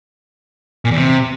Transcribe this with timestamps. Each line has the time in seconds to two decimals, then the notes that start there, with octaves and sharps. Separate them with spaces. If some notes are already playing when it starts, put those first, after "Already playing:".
0.85 A#2
0.91 E2
0.97 C3